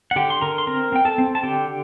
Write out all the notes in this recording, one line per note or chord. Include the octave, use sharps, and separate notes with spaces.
F#5
D3 G4 G5
C6
D3 A#4 A#5
C6
C4 A#4 A#5
C4 G5
A4 A5
C4
A5
D3 G4 G5